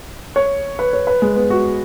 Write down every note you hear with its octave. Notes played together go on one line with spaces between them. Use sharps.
C#5
B4
C#5
B4
G#3
B3
F#4